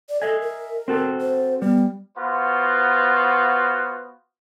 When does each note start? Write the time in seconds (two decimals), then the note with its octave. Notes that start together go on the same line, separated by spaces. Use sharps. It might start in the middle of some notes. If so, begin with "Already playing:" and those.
0.09 D5
0.22 A4 D#5 E5 G#5
0.41 A#4
0.88 C4 F#4 A4
1.21 C5
1.62 G3 B3
2.17 B3 F4 F#4 C5